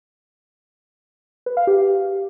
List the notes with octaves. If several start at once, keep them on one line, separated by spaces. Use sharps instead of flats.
B4
F5
G4